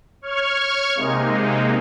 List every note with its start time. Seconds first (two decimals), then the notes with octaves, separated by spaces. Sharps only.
0.21 C#5 C#6 F6 G#6
0.95 C3 G#3 A#3 D#4